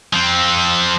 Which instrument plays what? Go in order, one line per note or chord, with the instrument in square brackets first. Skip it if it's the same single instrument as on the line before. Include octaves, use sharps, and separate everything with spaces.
[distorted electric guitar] F3 C4